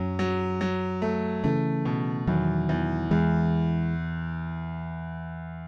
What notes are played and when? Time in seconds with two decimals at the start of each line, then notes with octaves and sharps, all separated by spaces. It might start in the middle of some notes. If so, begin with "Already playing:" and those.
Already playing: F#2 F#3 C#4
0.19 F#3
0.61 F#3
1.02 A3
1.44 C#3 E3 A3
1.85 B2
2.27 E2 D#3 F#3
2.69 E2
3.11 E2 E3 G#3